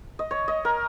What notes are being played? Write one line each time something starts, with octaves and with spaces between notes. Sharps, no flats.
D#5
C#5
D#5
A#4